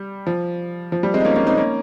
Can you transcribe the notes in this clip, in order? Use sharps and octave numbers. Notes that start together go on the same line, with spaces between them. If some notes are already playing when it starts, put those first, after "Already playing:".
Already playing: G3
F3
F3
G3
G#3 C4
D#4
A#3 C#4
A#3 C#4
C4 D#4
A#3 C#4